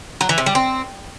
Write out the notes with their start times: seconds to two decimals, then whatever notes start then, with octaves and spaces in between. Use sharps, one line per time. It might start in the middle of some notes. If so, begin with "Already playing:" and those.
0.21 F#3
0.29 E3
0.38 C3
0.46 G3
0.55 C4